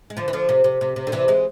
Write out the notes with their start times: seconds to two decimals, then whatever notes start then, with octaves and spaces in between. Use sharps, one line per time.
0.10 G#3
0.17 D3 F3
0.28 E3
0.33 D3 F3
0.49 C3
0.64 C3
0.81 C3
0.96 C3
1.07 D3
1.12 C3 E3
1.28 E3 G#3